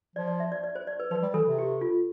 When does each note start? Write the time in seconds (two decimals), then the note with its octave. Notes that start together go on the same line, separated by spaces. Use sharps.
0.16 F3 D5
0.28 D5
0.40 E5
0.52 D5
0.64 D5
0.75 C5
0.87 D5
1.00 B4
1.11 F3 B4
1.23 G3
1.34 E3 A4
1.46 C3
1.58 G4
1.81 F4